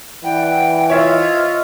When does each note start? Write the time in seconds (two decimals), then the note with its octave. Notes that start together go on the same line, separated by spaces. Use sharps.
0.24 E3 D5 F#5 G5 B5
0.90 F4 C5 C#5 D#5 E5